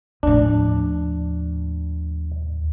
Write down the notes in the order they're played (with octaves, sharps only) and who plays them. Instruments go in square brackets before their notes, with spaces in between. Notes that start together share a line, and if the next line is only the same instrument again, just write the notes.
[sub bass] D#2 [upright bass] A2 F3 [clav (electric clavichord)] D4